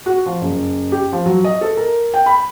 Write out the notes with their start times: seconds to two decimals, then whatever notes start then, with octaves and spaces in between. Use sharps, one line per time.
0.06 F#4
0.26 F3
0.41 F#1
0.92 G4
1.12 F3
1.26 F#3
1.44 D#5
1.61 A4
1.77 A#4
2.14 G5
2.26 B5